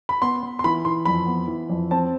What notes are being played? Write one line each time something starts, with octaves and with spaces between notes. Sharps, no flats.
B5
B3 C6
B3
C6
E3 B5
E3 C6
F2 B5
B3
E3
F2
C4 A5